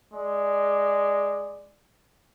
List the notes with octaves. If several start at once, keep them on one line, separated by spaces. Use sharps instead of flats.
G#3 D5